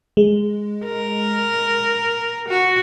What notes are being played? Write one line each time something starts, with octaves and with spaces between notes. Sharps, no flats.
G#3
A#4
F#4